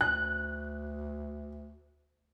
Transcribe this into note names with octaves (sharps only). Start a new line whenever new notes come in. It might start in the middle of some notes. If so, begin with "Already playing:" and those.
D2 F#6